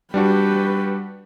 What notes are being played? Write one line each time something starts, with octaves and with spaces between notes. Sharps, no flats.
G3 D4 F#4 G4 B4